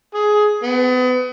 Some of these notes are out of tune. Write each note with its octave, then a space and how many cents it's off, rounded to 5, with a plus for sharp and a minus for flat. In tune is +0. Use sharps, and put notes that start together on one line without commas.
G#4 +15
B3 +35